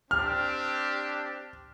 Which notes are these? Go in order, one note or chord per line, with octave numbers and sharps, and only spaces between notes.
C4 D4 G4 F6